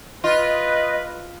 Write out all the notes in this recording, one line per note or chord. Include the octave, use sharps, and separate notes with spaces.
F4 B4 D#5